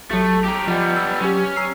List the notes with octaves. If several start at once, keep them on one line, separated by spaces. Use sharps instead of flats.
A1 F#3 A3
G4 A#4
F3 G3 B3 F4 D#5
E6
F#3 C#4 G4
A#5 E6 C7